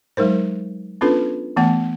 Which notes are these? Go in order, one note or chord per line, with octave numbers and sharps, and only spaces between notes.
F#3 G#3 D#4 A#4 C5
B3 C#4 D4 F4 A4 B4
E3 A3 B3 F#5